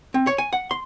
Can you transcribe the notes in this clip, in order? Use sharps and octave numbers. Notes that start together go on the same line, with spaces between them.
C4
C#5
G#5
F#5
C6